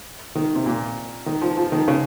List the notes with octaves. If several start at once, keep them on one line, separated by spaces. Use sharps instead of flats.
D#3
C3
A#2
D#3
F3
F3
D#3
C#3